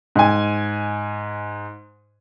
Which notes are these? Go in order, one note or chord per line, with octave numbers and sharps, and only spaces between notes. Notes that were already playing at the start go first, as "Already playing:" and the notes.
G#2 G#5